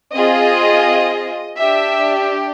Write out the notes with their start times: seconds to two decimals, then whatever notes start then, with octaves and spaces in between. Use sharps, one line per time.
0.13 C4 F4 G#4 D#5
1.59 D4 G4 E5